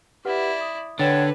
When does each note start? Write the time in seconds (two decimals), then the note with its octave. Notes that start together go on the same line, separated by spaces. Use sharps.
0.25 E4 G4 B4 D5 F#5
0.61 D#6
1.00 D3 D4 B4 C#5 F#5 G5 A6